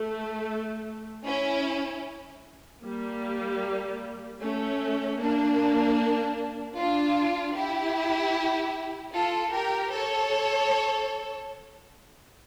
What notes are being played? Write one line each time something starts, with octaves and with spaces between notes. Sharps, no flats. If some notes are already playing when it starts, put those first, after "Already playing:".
Already playing: A3
C#4 E4
G3 A#3
A3 C#4
A#3 D4
D4 F4
E4 G4
F4 A4
G4 A#4
A4 C#5